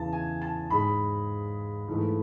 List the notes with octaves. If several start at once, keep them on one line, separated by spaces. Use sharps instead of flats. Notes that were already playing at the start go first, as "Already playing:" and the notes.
Already playing: E2 C#3 E3 A5
G#5
A5
G#2 G#3 B5
G#2 E3 A3